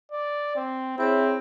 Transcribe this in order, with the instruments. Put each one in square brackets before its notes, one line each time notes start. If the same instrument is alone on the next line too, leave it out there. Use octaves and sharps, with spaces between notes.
[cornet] D5
C4
[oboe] C4 [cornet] E4 [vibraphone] G#4 C5 C#5